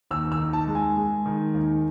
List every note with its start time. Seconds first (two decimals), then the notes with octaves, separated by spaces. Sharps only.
0.11 D#2 E6
0.32 E6
0.39 D#3
0.53 A5
0.67 G#3
0.75 G#5
0.97 G#3
1.26 D#3
1.54 D#2